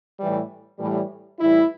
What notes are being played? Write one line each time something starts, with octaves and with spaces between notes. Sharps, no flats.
A2 E3 G3
A2 E3 G3
A2 E3 G3 E4